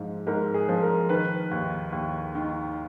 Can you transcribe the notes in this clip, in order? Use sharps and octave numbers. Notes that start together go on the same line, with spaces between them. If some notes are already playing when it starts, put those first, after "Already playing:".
Already playing: G#2 F3
G#2 A#4
G#4
F3
A#4
D#3 B4
D#2
D#2
D#3